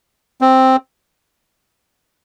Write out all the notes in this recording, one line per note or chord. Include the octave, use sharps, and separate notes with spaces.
C4